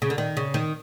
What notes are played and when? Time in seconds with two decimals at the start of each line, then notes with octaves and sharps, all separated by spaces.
0.02 C#3
0.10 D3
0.18 D#3
0.37 C#3
0.54 D#3